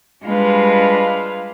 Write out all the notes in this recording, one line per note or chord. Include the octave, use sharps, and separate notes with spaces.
G3 G#3 D4 F4 B4 F5